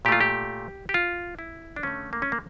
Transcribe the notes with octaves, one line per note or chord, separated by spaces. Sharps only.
A#2 A3 F4 G4
G4
G4
F4
E4
D4
D3 A3 C#4
A#3
C#4
A#3